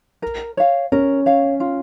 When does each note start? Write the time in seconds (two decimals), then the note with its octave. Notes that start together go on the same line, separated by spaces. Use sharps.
0.22 A#4
0.57 C#5 F5
0.92 C#4 A#4
1.26 C#5 F5
1.60 F4